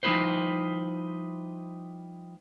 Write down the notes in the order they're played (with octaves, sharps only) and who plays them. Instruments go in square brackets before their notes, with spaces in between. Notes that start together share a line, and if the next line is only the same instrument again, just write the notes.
[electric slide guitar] F3 G3 D#4 E4 B4 C5